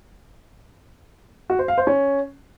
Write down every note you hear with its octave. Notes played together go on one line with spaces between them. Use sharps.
F#4
C5
F5
C5
C#4